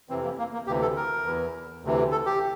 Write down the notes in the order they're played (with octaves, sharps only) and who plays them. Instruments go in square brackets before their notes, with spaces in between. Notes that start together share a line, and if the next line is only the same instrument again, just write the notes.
[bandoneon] F2 C3 E3 C4
A#3
A#3
A#3
D2 C3 E3 G4
A4
A#4
E2 E3
D2 C3 E3
A4
G4